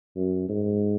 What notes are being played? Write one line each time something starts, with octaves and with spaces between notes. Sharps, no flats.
F#2
G#2